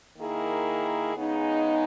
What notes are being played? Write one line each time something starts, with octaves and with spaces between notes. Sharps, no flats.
D#3 A#3 E4 G#4
C#3 G#3 B3 D#4